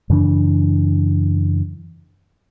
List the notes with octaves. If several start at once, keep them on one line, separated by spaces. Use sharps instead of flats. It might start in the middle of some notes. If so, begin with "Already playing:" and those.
F#2 C#3 E3 D4